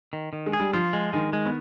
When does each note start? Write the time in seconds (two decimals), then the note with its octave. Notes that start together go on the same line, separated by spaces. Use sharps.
0.13 D#3
0.33 D#3
0.46 G#3
0.53 G#4
0.60 G3
0.73 F3 F4
0.93 G#3
1.13 D#3 G#3
1.33 G#3
1.46 B3